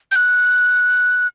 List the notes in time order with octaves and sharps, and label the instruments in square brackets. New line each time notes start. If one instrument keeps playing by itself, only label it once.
[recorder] G6
F#6